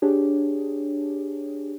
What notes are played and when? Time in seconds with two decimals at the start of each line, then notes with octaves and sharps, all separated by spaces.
0.02 D4 G4 G#4 C#5